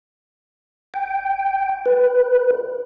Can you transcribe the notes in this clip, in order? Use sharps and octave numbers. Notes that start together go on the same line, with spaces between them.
G5
B4